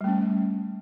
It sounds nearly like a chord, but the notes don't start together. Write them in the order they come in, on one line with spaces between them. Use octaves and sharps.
G3 A3 C#4